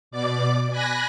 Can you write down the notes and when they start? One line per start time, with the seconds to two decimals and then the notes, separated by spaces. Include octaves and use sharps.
0.11 B2 D5 D6
0.70 G#5 B5 F#6 A#6